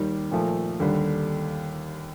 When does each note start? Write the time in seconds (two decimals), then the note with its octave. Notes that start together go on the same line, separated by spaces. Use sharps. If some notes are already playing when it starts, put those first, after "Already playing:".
Already playing: D#2 D#3 G3
0.31 A#2 F3 A3
0.80 D#2 D3 G3